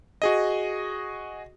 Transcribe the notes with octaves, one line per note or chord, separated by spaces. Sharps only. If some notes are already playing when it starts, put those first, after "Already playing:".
F#4 G#4 D#5